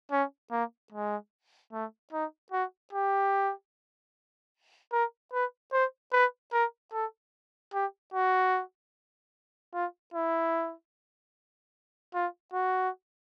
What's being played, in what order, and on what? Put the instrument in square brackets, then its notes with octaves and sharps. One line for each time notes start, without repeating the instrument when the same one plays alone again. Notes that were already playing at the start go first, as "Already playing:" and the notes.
[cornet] C#4
A#3
G#3
A3
D#4
F#4
G4
A#4
B4
C5
B4
A#4
A4
G4
F#4
F4
E4
F4
F#4